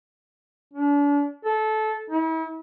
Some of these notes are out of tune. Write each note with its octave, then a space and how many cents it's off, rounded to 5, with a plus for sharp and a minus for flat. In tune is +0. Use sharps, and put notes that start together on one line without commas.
D4 -35
A4 -20
E4 -40